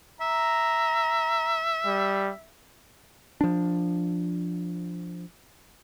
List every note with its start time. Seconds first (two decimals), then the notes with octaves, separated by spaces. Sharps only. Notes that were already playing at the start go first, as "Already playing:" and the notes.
0.21 E5 A#5
1.86 G3
3.41 F3 D4